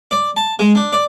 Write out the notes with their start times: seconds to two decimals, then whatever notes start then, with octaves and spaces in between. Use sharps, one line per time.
0.11 D5
0.37 A5
0.59 G#3
0.75 D4
0.93 D5